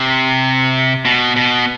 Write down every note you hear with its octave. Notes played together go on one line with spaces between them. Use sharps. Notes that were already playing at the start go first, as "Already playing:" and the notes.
Already playing: C3
B2
B2